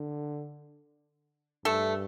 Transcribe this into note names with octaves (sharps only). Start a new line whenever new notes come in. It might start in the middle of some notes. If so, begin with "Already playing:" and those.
Already playing: D3
G2 A3 A4